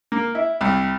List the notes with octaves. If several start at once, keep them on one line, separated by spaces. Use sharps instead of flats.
A#3
E4
C2